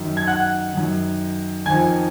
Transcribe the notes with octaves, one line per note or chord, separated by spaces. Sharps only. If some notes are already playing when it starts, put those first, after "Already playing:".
Already playing: F#2 D#3
G#6
F#5 F#6
F#2 D#3
F2 D#3 G#5 G#6